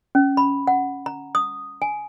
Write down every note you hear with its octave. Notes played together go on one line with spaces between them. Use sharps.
C#4
B5
F#5
A#5
D#6
G#5